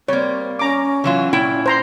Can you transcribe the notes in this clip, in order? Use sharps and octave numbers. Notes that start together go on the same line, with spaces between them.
G3 A#3 C4 C#5
C#4 A#5 D6
E3 F#3 F4
A#2 E4 G5
C5 A#5 C6